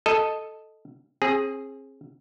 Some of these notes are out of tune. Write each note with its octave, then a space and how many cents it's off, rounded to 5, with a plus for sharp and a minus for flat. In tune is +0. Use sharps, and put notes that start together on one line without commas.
A4 +0 D#5 +0
C4 +40 G#4 +0